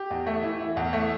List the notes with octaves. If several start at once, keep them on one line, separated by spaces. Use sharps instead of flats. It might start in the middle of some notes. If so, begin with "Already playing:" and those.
Already playing: G4
E2
A3
E3
E4
E2
A3